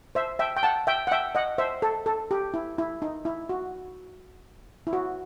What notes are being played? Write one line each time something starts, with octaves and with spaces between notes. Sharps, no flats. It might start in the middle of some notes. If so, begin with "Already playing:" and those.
C5 E5
E5 G5
G5
F#5 A5
E5 G5
F#5
E5 G5
D#5 F#5
C5 E5
A4
A4
G4
E4
E4
D#4
E4
F#4
E4
F#4